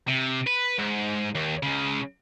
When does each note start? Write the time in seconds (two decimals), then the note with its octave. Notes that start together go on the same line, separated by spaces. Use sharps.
0.08 C3
0.47 B4
0.79 G#2
1.35 D#2
1.63 C#2 C#3